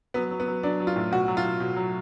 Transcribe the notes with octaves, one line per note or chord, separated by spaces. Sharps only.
F#3 B3
F#3
B3
F#3
F#3 D4
F#3
F4
A2
B2 F#4
F#3
F4
B2
B2
F#3